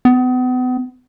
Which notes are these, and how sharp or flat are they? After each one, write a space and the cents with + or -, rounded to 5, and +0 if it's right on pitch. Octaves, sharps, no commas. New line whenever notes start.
B3 +35